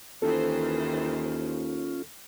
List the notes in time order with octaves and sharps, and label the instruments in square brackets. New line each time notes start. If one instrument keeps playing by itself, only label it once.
[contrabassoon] D#2 [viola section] D#3 E3 C5 [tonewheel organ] C#4 F4 [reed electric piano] A4